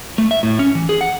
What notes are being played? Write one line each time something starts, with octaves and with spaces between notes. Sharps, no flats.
A3
E5
A2
C#4
E3
G#4
F#5